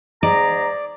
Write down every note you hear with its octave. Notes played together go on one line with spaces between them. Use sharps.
G#2 G#4 D5 A#5